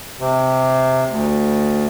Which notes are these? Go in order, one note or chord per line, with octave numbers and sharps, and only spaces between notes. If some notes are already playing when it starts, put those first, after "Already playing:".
C3
D2